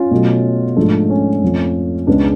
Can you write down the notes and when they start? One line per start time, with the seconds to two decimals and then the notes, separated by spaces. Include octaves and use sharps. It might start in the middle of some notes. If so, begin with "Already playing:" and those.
Already playing: C#4 F4
0.11 B2 F#3 A3
0.76 G#2 F3 A3 D4
1.10 C#4
1.42 F2 F3 A3
2.07 C#2 C#3 G#3 B3 D4